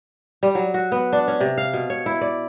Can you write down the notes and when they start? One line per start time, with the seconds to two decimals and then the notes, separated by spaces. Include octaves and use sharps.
0.43 G3
0.55 F#3
0.74 F#4
0.92 B3
1.13 D4
1.28 C#4
1.40 C3
1.58 F5
1.73 B2
1.90 C#5
2.06 E4
2.21 D5